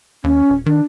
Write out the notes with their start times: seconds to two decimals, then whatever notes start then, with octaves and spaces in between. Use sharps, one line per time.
0.24 D#2 C#4
0.50 D#1
0.66 D#3 D4